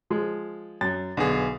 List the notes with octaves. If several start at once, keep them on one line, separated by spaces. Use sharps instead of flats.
F3 G#3
F#2 A6
B1 D3 B3 G#4